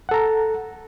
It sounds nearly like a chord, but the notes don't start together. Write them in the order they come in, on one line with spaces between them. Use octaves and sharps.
F#5 A4 A#5